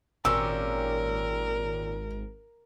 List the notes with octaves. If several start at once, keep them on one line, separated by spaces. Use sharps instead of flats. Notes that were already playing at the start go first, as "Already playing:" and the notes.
G#1 A#2 C#4 G4 A#4 E6